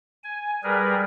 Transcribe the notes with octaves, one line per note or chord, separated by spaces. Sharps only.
G#5
G3 G#4 A#4 B4